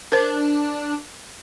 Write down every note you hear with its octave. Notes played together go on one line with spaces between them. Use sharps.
D4 A#4 C5